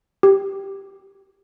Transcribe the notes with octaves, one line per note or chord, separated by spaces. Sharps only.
G4